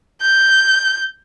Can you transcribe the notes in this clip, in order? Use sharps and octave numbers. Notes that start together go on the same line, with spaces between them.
G6